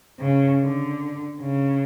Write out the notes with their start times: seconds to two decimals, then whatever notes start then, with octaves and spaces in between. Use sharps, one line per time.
0.20 C#3
0.60 D3
1.40 C#3